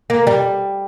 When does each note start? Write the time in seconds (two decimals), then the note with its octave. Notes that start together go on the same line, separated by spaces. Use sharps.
0.10 A#3
0.27 G3